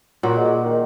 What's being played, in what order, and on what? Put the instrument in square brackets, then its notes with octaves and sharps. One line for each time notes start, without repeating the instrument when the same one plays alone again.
[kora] A#2 [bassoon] F#4
[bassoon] G#3
D#3